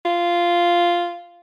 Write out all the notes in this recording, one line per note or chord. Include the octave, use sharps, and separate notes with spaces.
F4